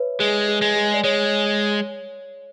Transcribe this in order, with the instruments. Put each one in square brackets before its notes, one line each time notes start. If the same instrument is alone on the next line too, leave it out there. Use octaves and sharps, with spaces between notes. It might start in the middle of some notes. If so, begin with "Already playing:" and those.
Already playing: [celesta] B4 C#5 E5
[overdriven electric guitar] G#3 [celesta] G#4
[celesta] G#4
[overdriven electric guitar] G#3
[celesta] G#4
D5
[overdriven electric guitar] G#3 [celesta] C#5